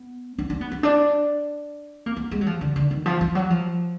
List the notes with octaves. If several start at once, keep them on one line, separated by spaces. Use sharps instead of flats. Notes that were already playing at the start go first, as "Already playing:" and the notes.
Already playing: B3
D4
D4
B3
B3
D4
A#3
B3
G#3
F#3
F3
D3
D3
D#3
F3
F3
F#3
F3